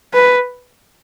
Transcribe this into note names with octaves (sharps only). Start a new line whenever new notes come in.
B4